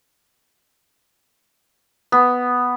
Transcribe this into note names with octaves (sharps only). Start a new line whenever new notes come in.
B3